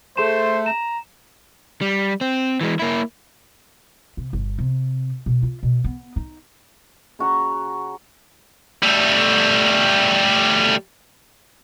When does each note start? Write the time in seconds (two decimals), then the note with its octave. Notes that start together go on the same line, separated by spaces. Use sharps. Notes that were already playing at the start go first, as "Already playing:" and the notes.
0.17 A3 G#4 C5 C6 E7
0.66 A#5 E7
1.81 G3
2.21 C4
2.61 E3 G#3
2.80 A#3 E4
4.17 C3
4.33 G1
4.59 C3
5.26 B2
5.43 F4
5.63 B2
5.84 B3
6.16 D#4
7.19 C#3 F#4 A#5
8.83 G3 A3